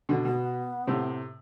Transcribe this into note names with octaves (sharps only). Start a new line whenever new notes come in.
B2 D3
B2 B3
A2 C3